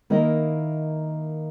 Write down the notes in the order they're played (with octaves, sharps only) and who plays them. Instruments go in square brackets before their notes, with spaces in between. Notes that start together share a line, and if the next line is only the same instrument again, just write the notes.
[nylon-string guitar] D#3 A#3 E4 A#4 D#5